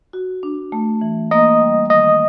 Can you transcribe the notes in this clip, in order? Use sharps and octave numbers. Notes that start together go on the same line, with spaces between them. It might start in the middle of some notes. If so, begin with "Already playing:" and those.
F#4
D4
A3
E3
A#3 D#5
G3
D#3 D#5